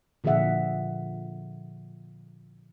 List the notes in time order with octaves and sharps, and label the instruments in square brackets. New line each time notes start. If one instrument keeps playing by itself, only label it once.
[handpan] A#2 D3 F3 G#4 E5 F#5